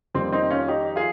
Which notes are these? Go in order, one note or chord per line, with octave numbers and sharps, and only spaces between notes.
F2 D#3 G3 A#3 C4
C4 D#4
C#4 F4
D#4 G4
F4 G#4